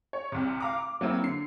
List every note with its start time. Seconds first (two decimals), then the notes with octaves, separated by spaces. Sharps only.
0.13 C#5
0.32 C2 C3
0.60 F5 A#5 D6
0.78 D6
1.01 F#3 A#3 C4 E4
1.22 D3 C7